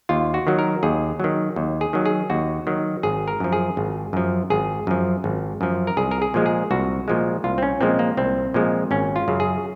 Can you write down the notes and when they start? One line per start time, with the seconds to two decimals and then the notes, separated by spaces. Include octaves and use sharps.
0.09 D#2 F4
0.34 F#4
0.47 D#3 F#3
0.59 A#4
0.83 D#2 G#4
1.20 D#3 F#3
1.56 D#2
1.81 G#4
1.93 D#3 F#3
2.06 G#4
2.30 D#2 F#4
2.67 D#3 F#3
3.03 G#1 G#4
3.28 A#4
3.40 F#2 F3
3.52 G#4
3.77 G#1
4.13 F#2 F3
4.50 G#1 G#4
4.87 F#2 F3
5.24 G#1
5.61 F#2 F3
5.87 A#4
5.97 C2 G#4
6.11 A#4
6.22 G#4
6.34 A#2 F3 G#3
6.46 G#4
6.71 C2 F#4
7.08 A#2 F3 G#3
7.44 C2 F4
7.58 C4
7.63 C#4
7.81 A#2 F3 G#3 C4
7.99 A#3
8.17 C2 C4
8.54 A#2 F3 G#3
8.91 G#1 C#4
9.16 F4
9.28 F#2 C#3
9.40 G#4